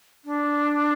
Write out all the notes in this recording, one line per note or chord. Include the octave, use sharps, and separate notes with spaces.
D4